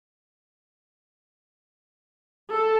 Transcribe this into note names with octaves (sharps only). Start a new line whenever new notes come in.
A4